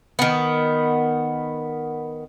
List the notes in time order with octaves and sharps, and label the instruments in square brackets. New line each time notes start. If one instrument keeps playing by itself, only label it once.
[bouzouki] D#3 B3